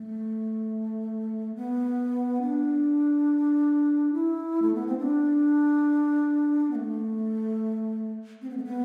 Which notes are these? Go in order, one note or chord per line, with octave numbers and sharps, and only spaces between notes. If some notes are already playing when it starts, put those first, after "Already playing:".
Already playing: A3
B3
D4
E4
A3
B3
C4
D4
B3
A3
C4
B3
A3
B3